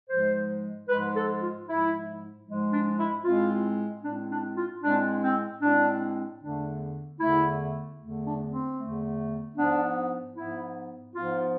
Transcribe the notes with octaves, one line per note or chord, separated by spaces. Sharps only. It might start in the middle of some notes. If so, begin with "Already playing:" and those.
G#2 F3 G#3 C5
G#2 F3 G#3 B4
A4
F4
G#2 F3 G#3 E4
G#2 F3 G#3
D4
E4
A2 G#3 C4 F4
A2 G#3 C4 D4
D4
F4
A2 G#3 C4 D4
C4
A2 G#3 C4 D4
E2 D3 A3 D4
E2 D3 A3 E4
E2 D3 A3
D4
C4
E2 D3 A3
G#2 F3 B3 D4
G#2 F3 B3 E4
G#2 F3 B3 F4